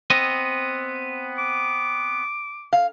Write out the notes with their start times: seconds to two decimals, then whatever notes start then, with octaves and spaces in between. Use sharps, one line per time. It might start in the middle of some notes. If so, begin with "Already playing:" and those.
0.10 B3 C4 D#5
1.38 D6
2.73 F5